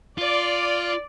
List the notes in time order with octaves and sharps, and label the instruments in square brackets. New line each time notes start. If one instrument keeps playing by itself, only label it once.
[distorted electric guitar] F4 [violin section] D5